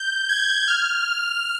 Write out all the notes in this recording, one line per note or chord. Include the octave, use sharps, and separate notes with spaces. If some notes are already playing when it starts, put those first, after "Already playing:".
Already playing: G6
G#6
F6